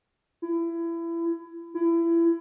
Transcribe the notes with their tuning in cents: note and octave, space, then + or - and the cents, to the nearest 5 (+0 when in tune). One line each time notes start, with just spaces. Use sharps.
E4 +25
E4 +25